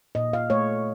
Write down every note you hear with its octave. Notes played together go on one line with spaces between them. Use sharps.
A#2 D#5
F5
A3 C#5